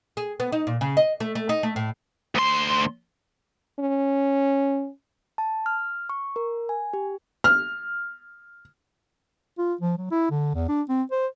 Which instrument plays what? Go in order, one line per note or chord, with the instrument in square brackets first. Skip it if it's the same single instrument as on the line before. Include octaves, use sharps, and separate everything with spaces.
[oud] G#4
B3
D#4
A#2
C#3
D#5
A3
A3
D#4
A3
A2
[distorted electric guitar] D2 C6
[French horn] C#4
[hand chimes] A5
F6
C#6
A#4
G#5
G4
[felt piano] F6
[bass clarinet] F4
F3
F#3
E4
D3
E2
D4
C4
C5